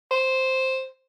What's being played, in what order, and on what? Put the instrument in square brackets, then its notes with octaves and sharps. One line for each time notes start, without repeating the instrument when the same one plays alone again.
[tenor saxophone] C5